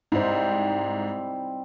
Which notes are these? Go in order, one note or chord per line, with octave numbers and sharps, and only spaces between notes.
G#2 C3 G3 D#4 E4 C5